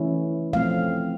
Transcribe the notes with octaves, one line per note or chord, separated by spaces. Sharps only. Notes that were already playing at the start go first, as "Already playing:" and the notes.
Already playing: E3 A3 C#4 E4
F3 A3 C4 F5